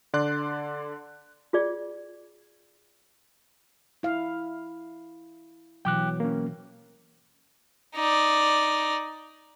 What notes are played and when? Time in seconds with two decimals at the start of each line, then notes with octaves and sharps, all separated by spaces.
0.13 D3 D5 C6 F#6
1.53 F4 G#4 D5
4.03 E4 F5
5.85 B2 E3 F#3 G5 D6 F#6
6.20 A#3 C#4
7.96 D#4 D5